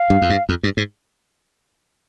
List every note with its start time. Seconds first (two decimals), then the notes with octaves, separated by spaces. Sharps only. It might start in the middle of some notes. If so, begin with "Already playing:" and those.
Already playing: F5
0.10 G2
0.22 F2
0.30 G2
0.49 F2
0.63 G2
0.77 G#2